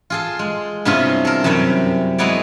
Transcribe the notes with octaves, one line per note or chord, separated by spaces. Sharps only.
F4 G#4 A4
G#3
G2 C3 B3 C#4 E4 F4
A4 A#4
F#2 C3 G3 C#5 E5 B5
G#3 B3 E4 F#4 C#5 D5